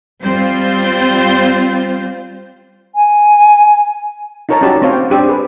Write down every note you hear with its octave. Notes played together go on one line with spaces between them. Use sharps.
G3 C4 F4 C5
G#5
D#4 F4 A#4 C#5 A5 A#5
C#4 D#4 F#4 G4 D5 A5
A3 C4 C5 C#5 F5
G5
D4 G4 C5 D5
G#4 B4